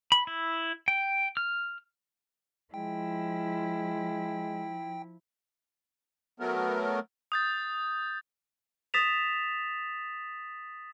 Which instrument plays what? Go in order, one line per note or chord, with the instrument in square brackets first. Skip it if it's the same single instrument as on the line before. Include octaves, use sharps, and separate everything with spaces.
[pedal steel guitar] B5
E4
G5
F6
[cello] F3 E4 [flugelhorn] G#3 [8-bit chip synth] G5
[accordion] F#3 A3 B3 A#4
[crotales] D#6 G6 A6
[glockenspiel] D#6 A6 B6 E7 F7